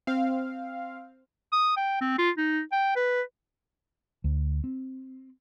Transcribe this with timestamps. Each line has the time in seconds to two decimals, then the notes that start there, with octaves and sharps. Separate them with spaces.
0.07 C4 F5
1.52 D#6
1.76 G5
2.01 C4
2.18 F4
2.37 D#4
2.72 G5
2.96 B4
4.24 D2
4.64 C4